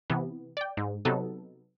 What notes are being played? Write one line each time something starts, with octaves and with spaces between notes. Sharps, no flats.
C3 E3 B3
D5 G5
G#2
C3 F#3 B3 D#4 A4